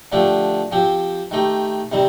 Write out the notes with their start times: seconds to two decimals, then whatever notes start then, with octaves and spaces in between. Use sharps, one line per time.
0.12 D3 F3 A3 D4 G4
0.72 F3 C4 G4
1.31 D#3 A3 D#4 G4
1.92 C3 D#3 G3 C4